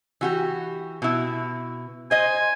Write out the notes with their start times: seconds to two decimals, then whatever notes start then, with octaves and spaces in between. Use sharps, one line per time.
0.21 E3 F#4 G4
1.02 B2 E4
2.11 C5 D#5 G#5